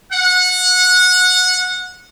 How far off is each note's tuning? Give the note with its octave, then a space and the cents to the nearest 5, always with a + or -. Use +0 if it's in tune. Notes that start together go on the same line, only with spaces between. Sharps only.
F#5 -20